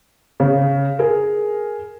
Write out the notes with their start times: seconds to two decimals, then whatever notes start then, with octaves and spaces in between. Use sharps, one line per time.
0.40 C#3
0.99 G#4 A#4